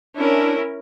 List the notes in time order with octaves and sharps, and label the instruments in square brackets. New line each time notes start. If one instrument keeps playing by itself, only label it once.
[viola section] C#4 E4 A#4 [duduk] D4